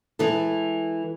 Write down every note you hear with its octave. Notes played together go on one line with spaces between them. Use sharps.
E3 G#3 E4 A4